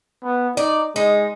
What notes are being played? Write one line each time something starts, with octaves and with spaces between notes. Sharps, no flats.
B3
D#4 D5
G#3 D#4